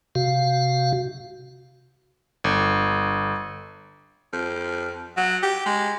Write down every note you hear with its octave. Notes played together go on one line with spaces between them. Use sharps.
C3 F#4 F5
G1
F2
F#3
G4
G#3